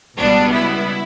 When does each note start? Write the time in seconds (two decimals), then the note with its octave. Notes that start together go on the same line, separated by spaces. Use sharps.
0.19 C#2 B2 G3 B3 D4
0.53 E4